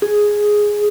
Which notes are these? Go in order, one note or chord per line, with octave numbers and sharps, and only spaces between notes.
G#4